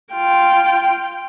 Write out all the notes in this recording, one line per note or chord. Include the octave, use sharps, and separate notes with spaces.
F4 G5